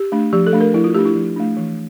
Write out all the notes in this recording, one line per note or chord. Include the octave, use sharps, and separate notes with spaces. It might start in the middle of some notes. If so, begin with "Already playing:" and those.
Already playing: G4
A3 D4
F3 G4
A4
A3 D4
A#4
F3 E4
F4
A3 D4 G4
E4
F3
A3 D4
E3